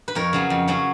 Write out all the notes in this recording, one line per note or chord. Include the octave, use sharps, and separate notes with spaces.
B4
F2 A#4 C#5
C#3 F#3 C#4
F2
C#3 F#3 C#4